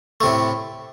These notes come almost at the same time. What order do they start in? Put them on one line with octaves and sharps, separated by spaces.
A3 C3 A2